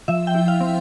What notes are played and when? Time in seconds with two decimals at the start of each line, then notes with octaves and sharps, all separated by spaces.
0.08 F3 E5
0.27 G5
0.35 E4
0.48 F5
0.60 C4